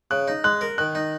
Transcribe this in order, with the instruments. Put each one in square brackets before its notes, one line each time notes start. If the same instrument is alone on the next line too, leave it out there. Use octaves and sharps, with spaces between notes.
[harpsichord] C#3 [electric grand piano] F#6
[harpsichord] D#4
[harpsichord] G#3 [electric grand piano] F#6
[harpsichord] A#4
[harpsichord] D#3 [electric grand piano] F#6
[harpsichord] D#4